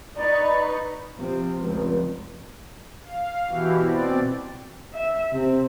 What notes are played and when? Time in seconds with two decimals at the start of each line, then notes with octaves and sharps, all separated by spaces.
0.16 D#4 B4 D5 C#6
1.16 C3 F3
1.61 F1 C#2
3.03 F5
3.47 B2 E3 E4 F#4 G4
3.79 B2 C4 D5
4.94 E5
5.33 C3 C4